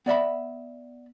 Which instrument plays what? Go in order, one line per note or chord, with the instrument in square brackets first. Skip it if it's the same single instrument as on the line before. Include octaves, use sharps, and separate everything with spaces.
[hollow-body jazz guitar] B3 D5 E5 B5